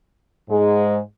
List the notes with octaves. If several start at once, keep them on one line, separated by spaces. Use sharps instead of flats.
G#2 G#3